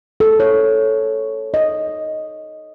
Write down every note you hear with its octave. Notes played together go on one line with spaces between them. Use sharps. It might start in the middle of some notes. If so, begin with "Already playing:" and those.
A4
C#5
D#5